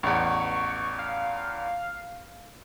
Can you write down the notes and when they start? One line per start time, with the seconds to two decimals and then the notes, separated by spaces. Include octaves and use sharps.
0.03 A1 E2 C#6
0.99 F5